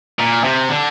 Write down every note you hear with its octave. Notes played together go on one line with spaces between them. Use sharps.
A#2
C3
D3